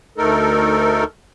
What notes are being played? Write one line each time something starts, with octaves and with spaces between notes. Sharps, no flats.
D2 A3 D#4 A4 A#4